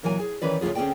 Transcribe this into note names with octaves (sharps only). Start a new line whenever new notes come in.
A#2 E3 F#3 A#4 G#5
G#4
D#3 E3 C#4 B4 D5
D2 A2 C#4 F4 G#4
D2 C4 C#4 G#4 D5 G5